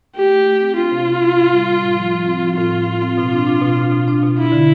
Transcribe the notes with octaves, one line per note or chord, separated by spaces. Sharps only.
A3 G4
A3
A3
C4
D4 F4
C3
C3
C3
A2
G3
G3
A2
F3
F3
C4
F3
A2 F4
A2
A2
C4
B2
D4
D4
B2
D4
B2
D4
B2
D4 E4
D3